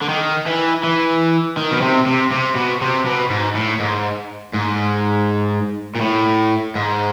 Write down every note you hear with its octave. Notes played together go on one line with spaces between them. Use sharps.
D3
D#3
E3
E3
D#3
B2
C3
C3
C3
B2
C3
B2
G#2
A2
G#2
G#2
A#2
A2
G#2